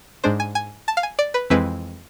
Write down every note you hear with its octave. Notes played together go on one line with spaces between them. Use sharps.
G#2 G#3 D4 C5
G#5
G#5
A5
F5
G#5
D5
B4
F2 E3 G#3 C4 E4 B4